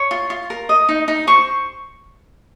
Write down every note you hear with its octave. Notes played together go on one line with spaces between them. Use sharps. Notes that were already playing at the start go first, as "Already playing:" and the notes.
Already playing: C#5
F4
F4
A#4
D#5
D#4
D#4
C5 C#6